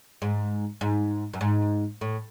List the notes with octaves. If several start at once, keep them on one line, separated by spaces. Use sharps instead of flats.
G#2
G#2
F#2
G#2
A2